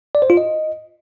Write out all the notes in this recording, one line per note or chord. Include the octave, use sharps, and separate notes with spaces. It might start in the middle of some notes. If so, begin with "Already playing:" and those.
D5
C5
F4
D#5